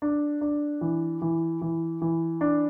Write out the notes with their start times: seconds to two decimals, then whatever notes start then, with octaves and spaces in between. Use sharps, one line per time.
0.02 D4
0.41 D4
0.81 E3
1.22 E3
1.62 E3
2.02 E3
2.41 D4